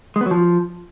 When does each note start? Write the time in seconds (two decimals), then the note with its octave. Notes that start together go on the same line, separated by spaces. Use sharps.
0.16 G#3
0.21 B3
0.26 F#3
0.31 F3